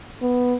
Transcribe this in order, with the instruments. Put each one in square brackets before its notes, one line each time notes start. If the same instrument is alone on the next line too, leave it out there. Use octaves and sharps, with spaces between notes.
[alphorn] B3